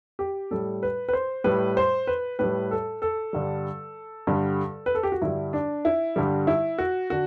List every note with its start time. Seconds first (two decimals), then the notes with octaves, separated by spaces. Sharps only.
0.19 G4
0.51 A2 G3 A4
0.83 B4
1.09 B4
1.13 C5
1.44 A2 G3 B4
1.77 C5
2.07 B4
2.39 A2 G3 B4
2.71 A4
3.02 A4
3.33 G2 D3 G3
4.27 G2 D3 G3
4.86 B4
4.95 A4
5.03 G4
5.12 F#4
5.22 G2 D3 G3 E4
5.53 D4
5.85 E4
6.16 G2 D3 G3
6.47 E4
6.78 F#4
7.10 D3 F#4